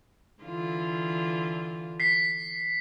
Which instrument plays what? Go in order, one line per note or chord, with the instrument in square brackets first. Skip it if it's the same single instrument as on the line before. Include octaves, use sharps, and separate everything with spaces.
[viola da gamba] D3 E3 F4
[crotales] B6 C7